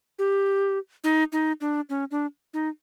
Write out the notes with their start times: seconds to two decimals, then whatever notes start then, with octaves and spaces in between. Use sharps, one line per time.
0.19 G4
1.04 D#4
1.32 D#4
1.61 D4
1.90 C#4
2.11 D4
2.54 D#4